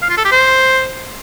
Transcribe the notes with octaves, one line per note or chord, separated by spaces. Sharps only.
F5
F4
A4
G4
C5